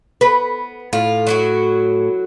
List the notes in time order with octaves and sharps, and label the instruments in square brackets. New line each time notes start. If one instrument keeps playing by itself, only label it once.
[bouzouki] B3 [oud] B4
[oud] A2 [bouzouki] F4
[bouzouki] F#3 E4 F#4